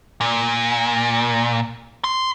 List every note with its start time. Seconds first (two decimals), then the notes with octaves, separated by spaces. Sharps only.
0.21 A#2
2.04 C6